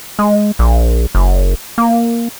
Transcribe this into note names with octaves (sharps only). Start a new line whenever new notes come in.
G#3
A#1
F#1
A#3